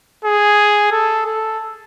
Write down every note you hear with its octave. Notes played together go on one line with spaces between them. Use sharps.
G#4
A4
A4